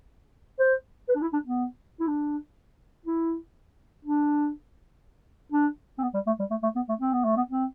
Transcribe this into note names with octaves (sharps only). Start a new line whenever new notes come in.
C5
B4
D4
E4
D4
B3
E4
D4
E4
D4
D4
C4
B3
G3
A3
G3
A3
A3
B3
A3
C4
B3
A3
B3
C4